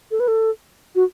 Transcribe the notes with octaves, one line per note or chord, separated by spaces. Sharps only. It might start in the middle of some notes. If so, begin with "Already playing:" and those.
A4
B4
A4
F#4